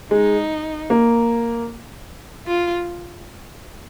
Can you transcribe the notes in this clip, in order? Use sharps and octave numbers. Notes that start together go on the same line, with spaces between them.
G#3 D#4
A#3
F4